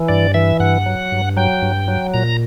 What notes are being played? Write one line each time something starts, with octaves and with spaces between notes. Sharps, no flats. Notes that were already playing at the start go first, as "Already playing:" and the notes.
Already playing: E3
G2 D5
E3 E5
G2 F#5
F#3
G2
F#3 G5
G2
F#3
A#2 A#5